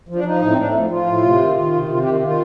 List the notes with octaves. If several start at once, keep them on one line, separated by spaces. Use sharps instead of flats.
F3
D4
F3 D#4
A2
C4
A2 D4
A3
F3
F3 F4
A2
C3
D#3
D#3
C3
C3 F4
D#3 G4
F4
D#3 F4